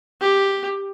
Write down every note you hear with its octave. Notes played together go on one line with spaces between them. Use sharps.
G4